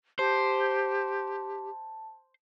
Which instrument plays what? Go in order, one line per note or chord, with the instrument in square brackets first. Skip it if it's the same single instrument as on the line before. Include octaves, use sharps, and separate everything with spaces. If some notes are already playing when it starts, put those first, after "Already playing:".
[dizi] G4 [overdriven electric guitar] C5 [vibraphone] A5